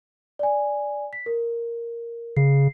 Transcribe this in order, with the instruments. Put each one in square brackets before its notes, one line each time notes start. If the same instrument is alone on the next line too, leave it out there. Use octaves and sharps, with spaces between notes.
[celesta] D5 G#5
B6
A#4
[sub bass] C#3 [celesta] C7